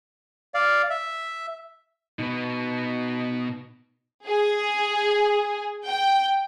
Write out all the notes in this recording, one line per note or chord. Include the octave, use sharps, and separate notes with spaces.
D5 F5
E5
B2 B3 D#4
G#4
G5